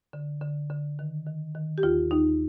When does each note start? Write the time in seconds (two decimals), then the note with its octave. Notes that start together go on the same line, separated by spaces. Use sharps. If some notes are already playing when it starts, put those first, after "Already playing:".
0.13 D3
0.42 D3
0.70 D3
0.99 D#3
1.26 D#3
1.55 D#3
1.78 G4
1.83 D#2 F4
2.11 D#2 D#4